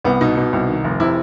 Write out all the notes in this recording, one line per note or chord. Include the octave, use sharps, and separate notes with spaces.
C2 B3
B2 D#4
B2
C2
D#3
F1
C3 E4